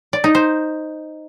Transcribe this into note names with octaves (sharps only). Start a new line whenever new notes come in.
D5
D#4
C5